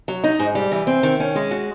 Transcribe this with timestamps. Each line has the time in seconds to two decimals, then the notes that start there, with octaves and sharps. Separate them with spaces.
0.08 F#3
0.24 D#4
0.39 G#2
0.55 G3
0.72 E3
0.87 C4
1.03 D#3
1.20 C#4
1.36 G#3
1.51 F#4